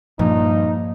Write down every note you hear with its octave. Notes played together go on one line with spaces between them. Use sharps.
G2 A#2 F3 D#4